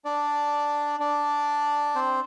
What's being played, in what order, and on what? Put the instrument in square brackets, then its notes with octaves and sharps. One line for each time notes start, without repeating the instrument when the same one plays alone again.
[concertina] D4 D5
D4 D5
C4 C5